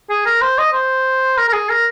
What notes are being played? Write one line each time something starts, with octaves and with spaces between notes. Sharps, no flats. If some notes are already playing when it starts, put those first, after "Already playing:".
G#4
A#4
C5
D#5
C5
A#4
A#4
G#4
A#4